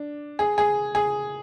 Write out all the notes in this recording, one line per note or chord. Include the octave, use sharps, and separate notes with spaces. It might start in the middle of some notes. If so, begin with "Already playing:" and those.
Already playing: D4
G#4
G#4
G#4